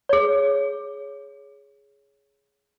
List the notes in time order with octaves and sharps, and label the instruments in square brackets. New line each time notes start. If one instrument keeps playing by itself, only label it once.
[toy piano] G#4 C#5